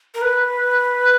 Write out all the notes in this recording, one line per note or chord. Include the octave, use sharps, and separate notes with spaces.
A#4
B4